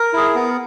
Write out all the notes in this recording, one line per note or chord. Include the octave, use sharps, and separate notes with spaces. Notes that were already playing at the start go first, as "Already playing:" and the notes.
Already playing: A#4
E4 G#4
B3